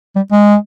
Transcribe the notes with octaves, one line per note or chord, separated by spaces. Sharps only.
G3
G#3